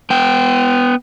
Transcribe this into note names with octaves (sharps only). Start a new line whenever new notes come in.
B3 G5